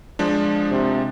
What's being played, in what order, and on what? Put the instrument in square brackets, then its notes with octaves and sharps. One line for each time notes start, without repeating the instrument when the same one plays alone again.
[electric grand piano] F3 G#3 D4
[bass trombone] C3